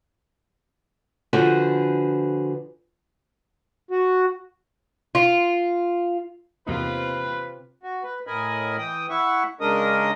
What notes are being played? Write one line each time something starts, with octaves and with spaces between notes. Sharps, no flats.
D3 F3 F#4 G#4 B4 C5
F#4
F4
E2 C3 A#3 C4 D#4 F4 B4
F#4
B4
A2 A#4 D#5 G#5 B5
E3 G5 D#6
E4 E5 F#5 C#6
C#3 G#3 D4 A#4 D#5 D#6